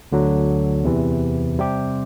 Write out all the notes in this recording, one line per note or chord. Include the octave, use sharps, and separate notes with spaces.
D2 D3 F#3
E2 C3 E3
C3 G3 C4 G4